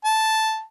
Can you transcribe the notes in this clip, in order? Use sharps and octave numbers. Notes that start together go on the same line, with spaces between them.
A5